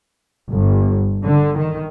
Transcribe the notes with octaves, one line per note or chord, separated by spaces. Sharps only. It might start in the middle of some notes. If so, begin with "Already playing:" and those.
G1
D3
D#3